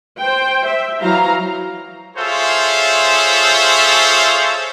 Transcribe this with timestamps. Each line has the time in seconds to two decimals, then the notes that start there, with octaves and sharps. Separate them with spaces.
0.20 C5 G5
0.66 E5
1.02 E3 F#3 F5 A#5
2.16 F4 G#4 A4 C5 C#5 E5